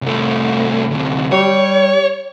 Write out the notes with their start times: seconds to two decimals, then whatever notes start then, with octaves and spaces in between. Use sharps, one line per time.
0.02 C2 A3
0.91 D2 C3
1.32 G3 C#5